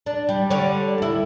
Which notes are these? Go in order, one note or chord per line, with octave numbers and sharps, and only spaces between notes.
D4
G3
D3 G3 C#5
D#2 E4